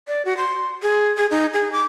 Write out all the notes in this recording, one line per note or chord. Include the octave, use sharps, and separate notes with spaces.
D5
F#4
C6
G#4
G#4
D#4
G#4
D6